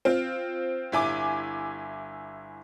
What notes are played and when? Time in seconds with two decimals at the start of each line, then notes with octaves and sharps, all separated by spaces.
0.05 C4 F4
0.92 G1 E4 G#5 D6